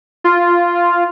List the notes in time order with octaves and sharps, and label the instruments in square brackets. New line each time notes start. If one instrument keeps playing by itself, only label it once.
[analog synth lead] F4